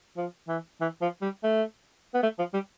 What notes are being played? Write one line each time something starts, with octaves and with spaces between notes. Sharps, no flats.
F3
E3
E3
F3
G3
A3
B3
A3
F3
G3